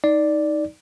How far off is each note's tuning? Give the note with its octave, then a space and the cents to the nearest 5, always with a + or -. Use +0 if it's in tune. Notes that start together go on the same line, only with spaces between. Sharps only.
D#4 +10 D5 +0